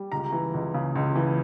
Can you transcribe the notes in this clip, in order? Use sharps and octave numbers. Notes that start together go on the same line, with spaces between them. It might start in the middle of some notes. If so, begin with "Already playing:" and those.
Already playing: G3
C#2 A#5
E3
C#2
C#3
C#2
E3